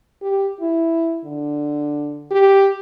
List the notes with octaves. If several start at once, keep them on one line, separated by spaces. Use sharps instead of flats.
G4
E4
D3
G4